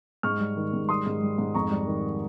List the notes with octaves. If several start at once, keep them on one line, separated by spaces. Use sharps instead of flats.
G#2 C#6 F6
G3
D#3
G#2
G3 C6 D#6
G#2
G3
G#2
F2 A#5 C#6
G3
D#3